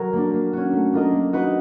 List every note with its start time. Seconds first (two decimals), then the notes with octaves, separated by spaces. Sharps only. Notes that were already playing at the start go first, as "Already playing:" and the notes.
Already playing: F#3 F#4 A#4
0.13 A#3 D4
0.33 A#3
0.53 C#4 F#4
0.73 A3
0.93 D4 F4 A#4 D#5
1.13 A#3
1.33 D#4 F#4 B4 D#5